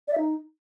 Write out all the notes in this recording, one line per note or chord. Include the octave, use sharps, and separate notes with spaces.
D5
E5
D#4